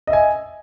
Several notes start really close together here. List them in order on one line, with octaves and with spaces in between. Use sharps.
D#5 E5 G#5